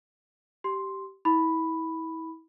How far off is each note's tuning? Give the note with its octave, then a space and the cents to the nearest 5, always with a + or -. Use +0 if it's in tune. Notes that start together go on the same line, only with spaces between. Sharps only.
G4 -15 C6 +0
E4 -35 B5 +0